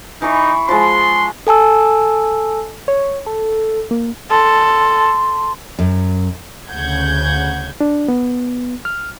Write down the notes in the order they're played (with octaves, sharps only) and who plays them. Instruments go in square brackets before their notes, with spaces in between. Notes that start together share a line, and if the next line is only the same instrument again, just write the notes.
[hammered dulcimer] E3 C#6 [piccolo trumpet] D#4
[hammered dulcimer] F3 G#3 [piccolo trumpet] C6
[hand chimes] A4 G#5 A5 E6
[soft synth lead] C#5
A4
A#3
[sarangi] A4 [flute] C6
[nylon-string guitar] F#2
[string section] D2 C#3 F#5 G6 G#6
[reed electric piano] D4
B3
F6